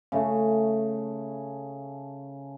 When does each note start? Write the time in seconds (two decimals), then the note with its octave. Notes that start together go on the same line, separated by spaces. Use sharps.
0.12 C#3 A3